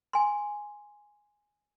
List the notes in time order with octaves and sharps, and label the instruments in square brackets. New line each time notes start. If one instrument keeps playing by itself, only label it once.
[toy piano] G#5 C6